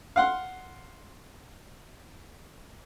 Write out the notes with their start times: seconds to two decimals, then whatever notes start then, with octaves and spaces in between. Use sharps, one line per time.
0.16 F5 F#5 C6